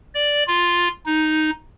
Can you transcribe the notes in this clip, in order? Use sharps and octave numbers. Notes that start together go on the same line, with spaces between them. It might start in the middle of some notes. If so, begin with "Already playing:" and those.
D5
F4
D#4